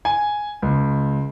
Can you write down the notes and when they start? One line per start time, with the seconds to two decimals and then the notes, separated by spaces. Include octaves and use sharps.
0.05 G#5
0.62 C#2